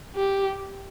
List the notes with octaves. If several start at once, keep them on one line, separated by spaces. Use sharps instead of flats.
G4